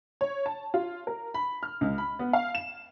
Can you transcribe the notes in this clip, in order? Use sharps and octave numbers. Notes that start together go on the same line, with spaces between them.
C#5
A5
F4
A#4
B5
F6
C#2
B5
B3
F5
E7